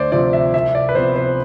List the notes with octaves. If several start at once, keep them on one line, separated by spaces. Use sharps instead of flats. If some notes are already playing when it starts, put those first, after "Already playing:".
Already playing: D2 C5 D5
C3 F3 C4 D5
E5
C2 E5
D5
B4
C3 F3 B3 C5
C5